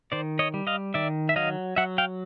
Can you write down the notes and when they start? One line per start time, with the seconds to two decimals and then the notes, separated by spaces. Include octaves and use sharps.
0.12 D#3 C5 D5
0.39 C#5 D#5
0.54 G3
0.67 D#5 F5
0.94 D#3 D5 E5
1.29 E5
1.36 F#3 D#5 F5
1.76 F#3 E5 F#5
1.98 F5 G5